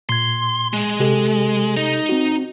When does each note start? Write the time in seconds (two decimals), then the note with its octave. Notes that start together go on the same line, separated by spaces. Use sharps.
0.09 A#2 C6 G#6
0.73 G#3
1.00 C3 G4 A4
1.77 D#4 D#5
2.09 C4 F#4